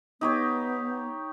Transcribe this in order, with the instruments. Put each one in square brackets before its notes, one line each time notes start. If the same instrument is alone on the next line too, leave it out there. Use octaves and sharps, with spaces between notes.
[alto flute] B3 [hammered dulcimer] D#4 G4 C#5